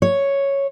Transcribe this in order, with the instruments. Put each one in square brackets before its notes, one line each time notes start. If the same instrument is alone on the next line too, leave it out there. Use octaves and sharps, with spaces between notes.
[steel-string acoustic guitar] C#5